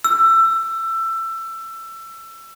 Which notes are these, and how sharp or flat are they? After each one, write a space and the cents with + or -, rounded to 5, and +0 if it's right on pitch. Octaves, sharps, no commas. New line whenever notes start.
E6 +20